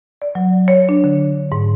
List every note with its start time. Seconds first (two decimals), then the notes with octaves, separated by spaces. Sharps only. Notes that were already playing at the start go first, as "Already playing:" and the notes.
0.22 D5
0.35 F#3
0.68 C#5
0.89 D4
1.04 D3
1.52 G#2